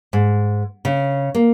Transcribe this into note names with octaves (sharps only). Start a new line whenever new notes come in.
G#2
C#3
A#3